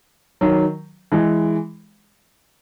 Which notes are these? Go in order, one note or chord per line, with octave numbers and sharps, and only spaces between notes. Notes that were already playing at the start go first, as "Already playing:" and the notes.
D#3 F#3
E3 G#3